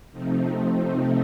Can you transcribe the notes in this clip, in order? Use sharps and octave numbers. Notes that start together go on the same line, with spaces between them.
C3 F3 A3 C4 D#4